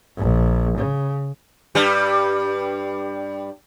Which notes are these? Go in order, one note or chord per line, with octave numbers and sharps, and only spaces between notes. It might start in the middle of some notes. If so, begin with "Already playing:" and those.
A#1
C#3
G2 G3